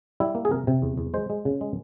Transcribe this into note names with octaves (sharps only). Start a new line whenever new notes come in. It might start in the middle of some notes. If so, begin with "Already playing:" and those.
G3 E4
A#3
G#4
C3 A#4
C3
E2
E2
G#3 C5
G#3
C#3
G#3